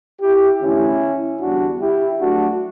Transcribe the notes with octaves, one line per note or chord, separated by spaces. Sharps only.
E4 G4
E2 D3 A3 C#4 E4
E2 D3 G3 B3 D4 F#4
E4 G4
G2 F#3 A3 D4 F#4